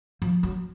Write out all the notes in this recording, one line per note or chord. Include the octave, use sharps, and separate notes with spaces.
F3
F#3